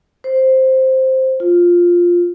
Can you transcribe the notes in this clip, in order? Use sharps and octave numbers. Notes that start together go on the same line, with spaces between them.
C5
F4